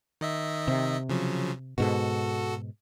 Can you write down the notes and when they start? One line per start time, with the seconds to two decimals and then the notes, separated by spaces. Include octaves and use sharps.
0.21 D#3 D#5 E5
0.68 C3
1.09 C#3 F3 F#3
1.78 G#2 B2 F#4 A4